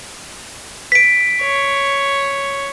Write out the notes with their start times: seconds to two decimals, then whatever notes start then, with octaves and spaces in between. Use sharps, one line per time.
0.92 B6 D7
1.41 C#5